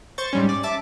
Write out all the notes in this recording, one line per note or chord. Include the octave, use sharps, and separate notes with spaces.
C5 C#6 A6
G#2 G3 C#4
D5
E5 A5 D6 A6